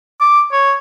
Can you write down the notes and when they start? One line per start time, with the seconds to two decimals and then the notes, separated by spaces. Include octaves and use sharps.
0.20 D6
0.52 C#5